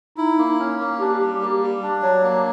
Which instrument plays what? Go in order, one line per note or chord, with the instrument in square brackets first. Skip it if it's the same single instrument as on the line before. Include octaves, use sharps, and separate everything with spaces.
[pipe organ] D#4 [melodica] E4
[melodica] A#3
C#4
A#3
[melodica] D4 [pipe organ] G4
[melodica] G3
A#3
G3
D4
F#3
A#3